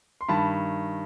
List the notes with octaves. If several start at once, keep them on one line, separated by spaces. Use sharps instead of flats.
C6
G2 D#3 A5 B5